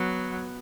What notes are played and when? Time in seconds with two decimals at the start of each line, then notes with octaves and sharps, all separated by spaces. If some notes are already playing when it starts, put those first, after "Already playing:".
Already playing: F#3 B3